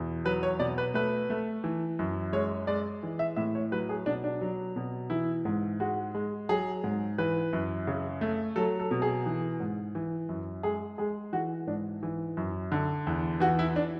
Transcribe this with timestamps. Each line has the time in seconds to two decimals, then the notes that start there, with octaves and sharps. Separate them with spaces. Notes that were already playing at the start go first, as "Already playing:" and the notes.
Already playing: E2 B2
0.25 F#3 B4
0.43 C#5
0.60 B2 D5
0.78 B4
0.94 A3 B4
1.30 A3
1.64 E3
1.99 F#2
2.33 G#3 C#5
2.67 G#3 D5
3.03 E3
3.19 E5
3.36 A2 E5
3.55 C#5
3.72 F#3 B4
3.89 G#4
4.06 B2 D4
4.24 D4
4.41 F#3
4.76 B2
5.10 E3 E4
5.45 G#2
5.80 G#3 F#4
6.15 G#3
6.49 F#3 G#4
6.84 G#2
7.18 E3 B4
7.53 F#2
7.87 C#3
8.21 A3
8.56 F#3 A4
8.80 A4
8.91 B2
9.02 G#4
9.26 E3
9.60 G#2
9.95 E3
10.29 F#2
10.63 G#3 G#4
10.98 G#3 G#4
11.33 E3 F#4
11.67 G#2 D4
12.03 E3
12.37 F#2
12.72 D3
13.07 E2
13.40 E3 F#4
13.59 E4
13.76 D4